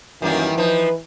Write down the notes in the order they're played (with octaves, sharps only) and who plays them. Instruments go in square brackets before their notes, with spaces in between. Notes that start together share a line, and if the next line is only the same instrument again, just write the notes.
[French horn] F#2 [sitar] D#3 G3 A#3 [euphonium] E3
[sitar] F3 D#4 [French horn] B4